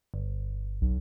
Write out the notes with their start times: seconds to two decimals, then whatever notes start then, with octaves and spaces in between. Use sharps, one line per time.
0.14 G1
0.81 B1